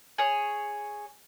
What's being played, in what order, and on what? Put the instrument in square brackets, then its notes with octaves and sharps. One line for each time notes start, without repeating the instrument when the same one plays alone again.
[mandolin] G#4 C#5